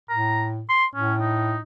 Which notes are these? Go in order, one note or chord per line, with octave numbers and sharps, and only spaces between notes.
A2 A#5
C6
A2 C#4
D#4